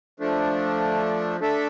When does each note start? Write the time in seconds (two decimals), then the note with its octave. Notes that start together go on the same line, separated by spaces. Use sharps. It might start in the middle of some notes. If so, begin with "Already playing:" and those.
0.20 F3 A3 D4
1.40 A3 D4 A4 E5